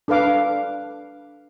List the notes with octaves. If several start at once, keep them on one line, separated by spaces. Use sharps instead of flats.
D4 A4 B4 F5 D6